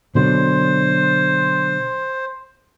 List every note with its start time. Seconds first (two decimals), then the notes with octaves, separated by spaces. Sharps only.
0.15 B2 D3 F#3 C5